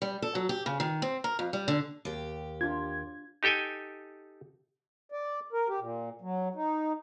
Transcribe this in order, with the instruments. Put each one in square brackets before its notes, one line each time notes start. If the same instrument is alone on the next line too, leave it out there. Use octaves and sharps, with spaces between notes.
[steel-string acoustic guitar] G3
A4
F#3
G4
C#3
D#3
C4
A#4
F2
G3
D3
D#2 G4
[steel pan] D4 F4 [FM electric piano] G#6
[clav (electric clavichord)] D#4 G4 A4 G5 G#5
[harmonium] D5
A#4
G4
A#2
F#3
D#4